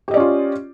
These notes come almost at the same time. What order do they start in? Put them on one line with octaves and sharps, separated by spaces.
G4 D#5 D5 C#4 F4